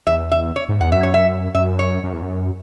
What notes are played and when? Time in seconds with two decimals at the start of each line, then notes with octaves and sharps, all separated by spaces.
0.07 E2 E5
0.32 E5
0.56 C#5
0.69 G#2
0.81 E2 F#5
0.92 F#2 E5
1.03 C#5
1.14 E5
1.55 F#2 E5
1.79 C#5
2.04 F#2
2.13 E2
2.23 F#2